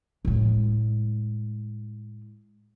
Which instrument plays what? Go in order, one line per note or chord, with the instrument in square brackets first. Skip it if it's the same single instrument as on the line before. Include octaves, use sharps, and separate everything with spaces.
[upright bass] A2 G#3